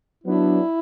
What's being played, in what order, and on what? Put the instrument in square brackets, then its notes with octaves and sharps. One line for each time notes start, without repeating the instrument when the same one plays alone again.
[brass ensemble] F#3 B3 D4 [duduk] E4